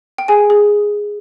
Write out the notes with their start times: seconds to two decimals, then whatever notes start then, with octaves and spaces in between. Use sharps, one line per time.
0.18 G5
0.28 G#4 G#5
0.50 G#4